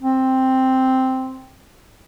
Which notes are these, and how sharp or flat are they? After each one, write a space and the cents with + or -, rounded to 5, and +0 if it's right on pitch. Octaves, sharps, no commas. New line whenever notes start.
C4 +0